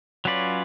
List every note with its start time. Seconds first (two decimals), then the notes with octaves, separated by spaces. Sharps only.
0.25 F#3 C#4 F4 B4 D5